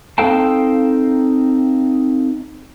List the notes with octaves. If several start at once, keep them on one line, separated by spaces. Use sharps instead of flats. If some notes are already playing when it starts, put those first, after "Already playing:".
C4 D#4 A4 F5 G5 A5